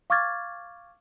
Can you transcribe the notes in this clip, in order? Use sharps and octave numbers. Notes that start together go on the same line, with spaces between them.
F5 C#6 D6 F6 G#6 A6